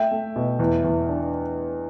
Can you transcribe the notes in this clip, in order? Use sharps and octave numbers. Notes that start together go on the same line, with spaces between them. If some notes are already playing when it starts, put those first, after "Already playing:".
Already playing: A3 E5 G5
A3
B2
E2
E2
D4